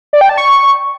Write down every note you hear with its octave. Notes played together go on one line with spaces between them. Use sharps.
D5
G5
A5
C#6